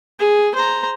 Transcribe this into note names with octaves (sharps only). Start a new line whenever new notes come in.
G#4
C5 A#5